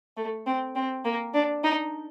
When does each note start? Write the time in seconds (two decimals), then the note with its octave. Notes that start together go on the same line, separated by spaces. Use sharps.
0.17 A3
0.47 C4
0.75 C4
1.04 A#3
1.34 D4
1.64 D#4